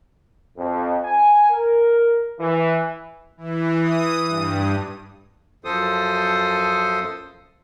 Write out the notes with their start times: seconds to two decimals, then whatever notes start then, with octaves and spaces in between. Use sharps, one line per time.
0.57 F2
1.05 G#5
1.51 A#4
2.40 E3
3.37 E3
3.82 D#6
4.27 G2
5.65 F#2 F3 A4 C5 D#6